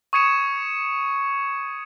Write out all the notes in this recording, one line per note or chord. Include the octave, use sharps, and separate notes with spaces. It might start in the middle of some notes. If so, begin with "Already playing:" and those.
C#6 D#6 G#6 C#7 D#7 E7